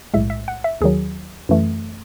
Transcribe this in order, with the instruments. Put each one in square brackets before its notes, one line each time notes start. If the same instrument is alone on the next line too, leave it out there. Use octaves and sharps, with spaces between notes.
[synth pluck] B1 A2 G#3 E5
E5
F#5
E5
D#2 D#3 F#3 G#4
F#2 E3 A3